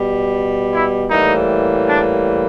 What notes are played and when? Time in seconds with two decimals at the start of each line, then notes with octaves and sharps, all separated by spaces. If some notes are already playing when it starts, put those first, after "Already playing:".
Already playing: B2 G3
0.71 E4
1.09 A2 E3 G3 A#3 D#4
1.87 D4